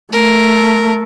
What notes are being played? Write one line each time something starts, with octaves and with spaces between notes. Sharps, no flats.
A3 A#4